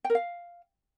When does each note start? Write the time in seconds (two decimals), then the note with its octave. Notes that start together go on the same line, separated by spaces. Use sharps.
0.04 G5
0.10 A#4
0.15 F5